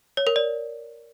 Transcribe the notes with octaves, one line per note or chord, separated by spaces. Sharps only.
C#5
A#4
D5